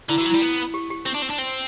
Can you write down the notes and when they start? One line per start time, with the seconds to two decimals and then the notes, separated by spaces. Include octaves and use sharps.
0.09 D3 E4
0.18 E3 F#4
0.25 F#3
0.30 G3 E4
0.42 B3
0.74 G4
0.90 G4
1.06 C4 G4
1.14 D4
1.22 C4
1.30 D4
1.38 C4